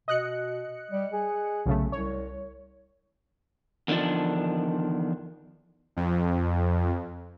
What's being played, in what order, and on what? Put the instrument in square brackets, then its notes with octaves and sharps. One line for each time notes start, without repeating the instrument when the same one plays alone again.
[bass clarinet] B2 [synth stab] D#5 F#6 C#7
[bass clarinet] G3
G#4
[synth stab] B1 C#3 A3
[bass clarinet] C2 [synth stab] C#5
[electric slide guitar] E2 D3 D#3 F3 D4
[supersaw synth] F2